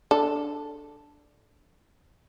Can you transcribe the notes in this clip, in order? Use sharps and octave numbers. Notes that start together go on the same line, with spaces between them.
D4 A4